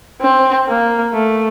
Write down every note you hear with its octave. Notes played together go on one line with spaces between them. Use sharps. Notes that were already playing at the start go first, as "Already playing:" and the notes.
C4
A#3
A3